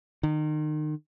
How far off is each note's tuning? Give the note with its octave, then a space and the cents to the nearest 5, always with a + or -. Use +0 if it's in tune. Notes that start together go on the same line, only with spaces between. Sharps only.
D#3 -30